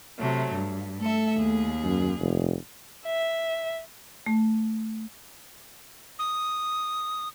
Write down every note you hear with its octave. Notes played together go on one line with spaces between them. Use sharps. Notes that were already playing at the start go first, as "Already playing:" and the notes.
C3 F#3 A3
G2
A3 A4 E5
D#2 G#4
F#2
F1
E5
A3
D#6